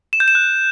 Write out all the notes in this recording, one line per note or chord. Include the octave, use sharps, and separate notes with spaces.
E7
G6
E7
F#6